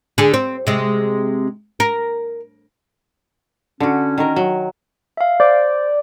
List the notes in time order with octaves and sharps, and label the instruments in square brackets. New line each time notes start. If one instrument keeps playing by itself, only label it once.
[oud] D3 G#4
C4
C3 G#3
A#4
[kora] D3 F#4 [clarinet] C#4
[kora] D#3 A#4
F#3
[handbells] E5 F5
[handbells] C5 [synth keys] D5